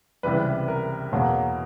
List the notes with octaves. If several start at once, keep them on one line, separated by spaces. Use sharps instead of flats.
C#2 C3 E3 G3 B4
A#4
E2 B2 F#3 A#3